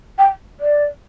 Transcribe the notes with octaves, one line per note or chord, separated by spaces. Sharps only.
G5
D5